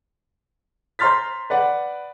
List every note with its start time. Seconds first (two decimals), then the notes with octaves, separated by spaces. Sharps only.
0.99 C5 A#5 C6 F6 A6 B6
1.50 B4 D5 F#5